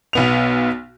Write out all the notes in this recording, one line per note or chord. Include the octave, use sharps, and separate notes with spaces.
B1 B3 F7